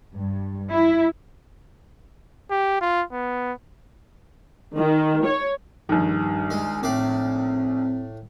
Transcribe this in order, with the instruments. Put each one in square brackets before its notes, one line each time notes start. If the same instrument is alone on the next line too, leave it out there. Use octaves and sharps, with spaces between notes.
[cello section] G2
E4
[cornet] G4
F4
B3
[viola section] D#3
C#5
[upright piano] A#1 D#3 [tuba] G2
[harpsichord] G#3
[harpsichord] A2 D5 [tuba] C4